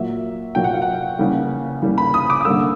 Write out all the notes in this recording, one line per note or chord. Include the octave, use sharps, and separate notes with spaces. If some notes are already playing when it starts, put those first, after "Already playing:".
Already playing: A#2 F#3 A#3 E5
A#2 F#3 A#3 G5
F#5
F5
F#5
C#3 E3 G3 A#3
C#3 E3 G3 A#3
B5
D#6
D6
D#6
D3 G3 A#3 E6